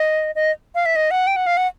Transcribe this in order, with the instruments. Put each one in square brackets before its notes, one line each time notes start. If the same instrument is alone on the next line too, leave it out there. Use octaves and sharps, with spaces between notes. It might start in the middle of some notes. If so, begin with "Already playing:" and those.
Already playing: [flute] D#5
D#5
F5
E5
D#5
F#5
G5
F#5
F5
F#5